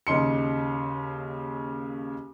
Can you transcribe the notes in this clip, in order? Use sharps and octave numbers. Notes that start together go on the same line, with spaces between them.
D#2 C#3 D#4 C6 C#7